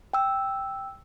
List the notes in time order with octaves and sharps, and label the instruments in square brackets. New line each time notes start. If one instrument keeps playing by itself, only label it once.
[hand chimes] G5 E6